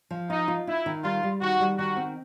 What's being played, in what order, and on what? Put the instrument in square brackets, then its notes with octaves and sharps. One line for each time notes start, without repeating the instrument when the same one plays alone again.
[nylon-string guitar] F3
[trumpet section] D#4 [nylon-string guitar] F4
[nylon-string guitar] F4
[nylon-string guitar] D#4 [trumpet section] E4
[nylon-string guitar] D#3
[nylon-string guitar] G3 [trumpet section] F4
[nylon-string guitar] G3
[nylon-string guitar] D#3 [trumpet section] F#4
[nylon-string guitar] G3
[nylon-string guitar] D#3 [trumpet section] F#4
[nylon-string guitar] C4